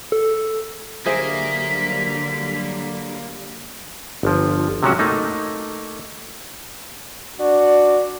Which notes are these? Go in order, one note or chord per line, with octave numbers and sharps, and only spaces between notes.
A4
D3 F#3 G3 A#3 G#4 C5 E5 B6
G1 F3
C3 F#3 G#3 C#4 F#4
A3 A#3 D#4
D4 F#4 D5